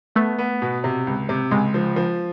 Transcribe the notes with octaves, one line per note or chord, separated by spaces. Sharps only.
A3 B3
B3
B2
C3
C#2
C3
C#2 G#3
F3
F3